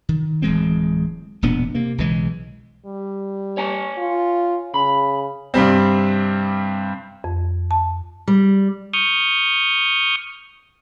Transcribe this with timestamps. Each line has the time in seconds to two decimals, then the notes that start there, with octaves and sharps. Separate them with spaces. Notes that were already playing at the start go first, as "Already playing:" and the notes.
0.09 D#3
0.42 D1 E3 G#3 C4
1.42 E1 A#2 B3 D4
1.75 C3 A#3
1.98 B1 C#3 E3 G#3
2.86 G3
3.57 C#5 G#5 A5
3.97 F4
4.74 C#3 B5
5.54 G2 C3 G3 C4
7.24 F2
7.71 A5
8.28 G3
8.94 C#6 D#6 F6 G6